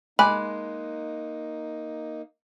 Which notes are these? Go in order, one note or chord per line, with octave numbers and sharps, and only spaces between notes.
G#3 A#3 D#4 G#5 B5 D6 F#6